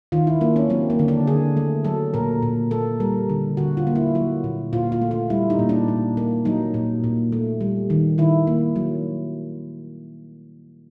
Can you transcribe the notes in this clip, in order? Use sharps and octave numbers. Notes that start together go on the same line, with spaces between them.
D#3 F4
E4
A#3 D4
C#4
F#3 C4
A#3
D3
D4
D3 G#4
A3
F#3 A4
A#2 A#4
A#2
A#3 A4
G3 A#4
D3
D3 F#4
F4
A#3
E4
F#3 F#4
A#2
A#2 F4
F4
A3
F4
G3 E4
D#4
A#2
D4
A#2
A#3
F#3 D#4
A#2
A#2
A3
G3
D#3
D#3 E4
A#3
F#3